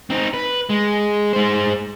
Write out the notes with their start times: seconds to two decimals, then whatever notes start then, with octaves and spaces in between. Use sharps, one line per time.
0.10 C4 D#4
0.34 B4
0.70 G#3
1.33 G#3 C5